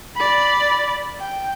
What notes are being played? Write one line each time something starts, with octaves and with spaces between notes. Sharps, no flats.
D5 B5
G5